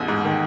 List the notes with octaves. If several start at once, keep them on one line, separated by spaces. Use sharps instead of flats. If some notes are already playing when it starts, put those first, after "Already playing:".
Already playing: A1 E2
G#2
D#3